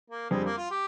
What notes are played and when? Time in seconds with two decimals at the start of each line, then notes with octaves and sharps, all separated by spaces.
0.10 A#3
0.30 F2 D3 G3 G#3 C4
0.44 A#3
0.57 F4
0.71 G4